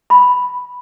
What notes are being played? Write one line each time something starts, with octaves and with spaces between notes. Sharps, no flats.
B5